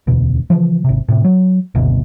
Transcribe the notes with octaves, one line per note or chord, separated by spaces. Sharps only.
E1 D2 B2
C#3 E3 F3
G#1 C3
A2 C3
F#3
F#1 D2 B2